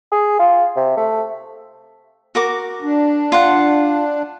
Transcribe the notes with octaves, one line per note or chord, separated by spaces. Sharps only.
G#4
F4
C3
A3
F#4 A#4 D6
D4
F4 F#5